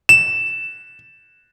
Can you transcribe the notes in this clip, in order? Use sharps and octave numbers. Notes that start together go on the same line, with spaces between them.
E7